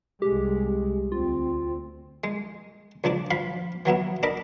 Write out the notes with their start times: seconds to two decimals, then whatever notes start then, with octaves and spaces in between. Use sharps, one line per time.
0.22 C2 G#3 G4
1.12 D2 C4 F4
2.24 G#3
3.04 C#2 F3 D4 D6
3.31 F3 F5 B5
3.86 E3 F#3 B3 E4
4.23 D4 A#4 D#5 B5 D6